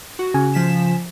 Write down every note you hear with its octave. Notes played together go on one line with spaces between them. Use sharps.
F#4
C#3 G#5
F3 B6 E7